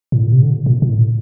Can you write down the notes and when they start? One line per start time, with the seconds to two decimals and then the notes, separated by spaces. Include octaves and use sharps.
0.12 A2
0.23 A#2
0.32 C3
0.43 D3
0.66 A#2
0.82 A#2
0.89 A2